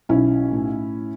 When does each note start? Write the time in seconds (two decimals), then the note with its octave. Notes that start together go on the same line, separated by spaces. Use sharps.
0.09 B1 C#4 E4
0.52 A2